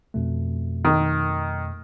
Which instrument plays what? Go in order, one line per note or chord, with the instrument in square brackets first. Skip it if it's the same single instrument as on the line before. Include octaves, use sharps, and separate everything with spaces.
[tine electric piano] F2 B2 A3
[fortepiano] D#3